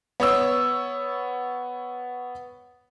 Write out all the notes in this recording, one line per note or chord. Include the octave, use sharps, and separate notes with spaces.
B3 C#5 E6